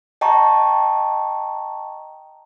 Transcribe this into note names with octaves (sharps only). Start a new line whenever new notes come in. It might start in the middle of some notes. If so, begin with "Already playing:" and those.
D#5 G5 A5 A#5 C#6